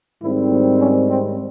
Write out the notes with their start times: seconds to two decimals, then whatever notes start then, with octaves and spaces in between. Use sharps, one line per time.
0.22 G#2 D#3 G3 C4 E4
0.80 C#4
1.09 C4